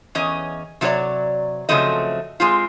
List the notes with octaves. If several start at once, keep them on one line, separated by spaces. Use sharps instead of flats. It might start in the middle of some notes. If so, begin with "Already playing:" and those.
E2 C#4 D#5
C3 F#3 D#4 F4 C#5 D5
C#3 F3 F#3 A3 C4 D#5
G#3 C4 F4